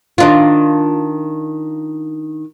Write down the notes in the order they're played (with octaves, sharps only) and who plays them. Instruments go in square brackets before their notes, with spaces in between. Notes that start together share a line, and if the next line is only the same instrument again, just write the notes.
[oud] D#3 D4 F4